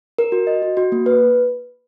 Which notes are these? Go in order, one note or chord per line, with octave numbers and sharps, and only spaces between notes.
A#4
F#4
D#5
F#4
F#4
A#3
B4